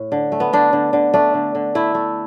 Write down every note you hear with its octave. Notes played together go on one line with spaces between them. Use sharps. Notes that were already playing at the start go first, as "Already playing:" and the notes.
Already playing: A2
D3
A3
B3
D3 D4
D3
D3
A3 D4
D3
D3
A3 E4
A3